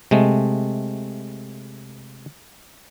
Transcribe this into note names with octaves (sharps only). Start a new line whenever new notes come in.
C3 G#3 A3